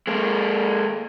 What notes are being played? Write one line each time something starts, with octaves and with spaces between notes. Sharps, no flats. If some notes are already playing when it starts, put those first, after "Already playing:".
G#3 A#3